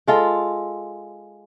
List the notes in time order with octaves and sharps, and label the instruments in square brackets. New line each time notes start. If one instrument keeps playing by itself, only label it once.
[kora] G#3 F4 A4